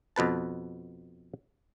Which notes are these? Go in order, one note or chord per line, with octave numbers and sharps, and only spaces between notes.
F2 B2 B4 A5